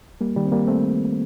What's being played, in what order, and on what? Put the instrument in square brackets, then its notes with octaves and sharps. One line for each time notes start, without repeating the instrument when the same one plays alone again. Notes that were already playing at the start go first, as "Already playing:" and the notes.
[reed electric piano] G3 A#3
D#3 G3
C4
G3 A#3
A3 C4